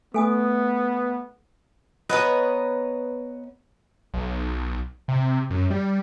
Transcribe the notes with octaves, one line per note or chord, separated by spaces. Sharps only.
A3 B3 A4 G#5 D#6
B3 B4 C#5 D#5 G#5 A#5 B5
B1
C3
F#2
G3